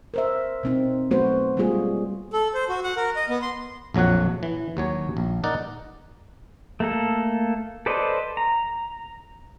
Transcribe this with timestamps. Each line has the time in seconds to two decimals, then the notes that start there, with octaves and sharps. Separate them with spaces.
0.14 A#4 C5 E5
0.63 B2 C4 D#4
1.11 F#3 A3 B3 F#4 B4 C5
1.57 G3 G#3 A#3 F4 G#4
2.33 A4
2.54 C5
2.69 F#4
2.84 F#5
2.96 A#4
3.16 D#5
3.29 B3
3.42 C6
3.94 A#1 F2 F#3 C#5 F#5
4.43 E3
4.77 D#2 F#3 C#5 G#5
5.17 A#1
5.44 D#4 A#4 D5 F#5
6.80 A3 A#3 A4
7.86 A4 B4 C5 D5 D#5
8.37 A#5